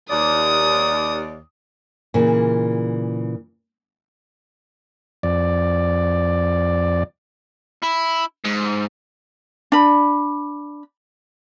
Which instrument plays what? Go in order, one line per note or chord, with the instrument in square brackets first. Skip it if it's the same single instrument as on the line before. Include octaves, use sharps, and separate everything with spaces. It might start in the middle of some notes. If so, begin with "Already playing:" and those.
[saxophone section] D#2 D5 [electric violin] D#6
[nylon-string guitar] A#2 C#3 E3
[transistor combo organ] F2 D5
[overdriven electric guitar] E4
G#2
[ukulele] D4 B5